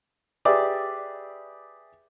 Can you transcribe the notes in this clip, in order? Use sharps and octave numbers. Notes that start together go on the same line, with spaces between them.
G4 G#4 B4 D5 E5